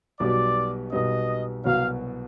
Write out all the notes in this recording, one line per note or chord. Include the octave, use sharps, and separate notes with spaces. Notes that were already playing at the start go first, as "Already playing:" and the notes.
B1 B2 G3 B3 D5
B1 B2 G3 B3 D#5
C2 B2 F#3 B3 F5